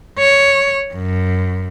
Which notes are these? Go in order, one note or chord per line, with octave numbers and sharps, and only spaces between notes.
C#5
F#2